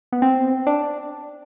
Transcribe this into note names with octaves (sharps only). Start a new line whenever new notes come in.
B3
C4
D4